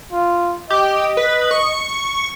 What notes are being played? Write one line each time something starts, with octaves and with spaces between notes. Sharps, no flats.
F4
G4 D#5
B4
C#6